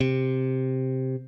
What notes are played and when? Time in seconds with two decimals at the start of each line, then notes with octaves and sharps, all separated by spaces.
0.01 C3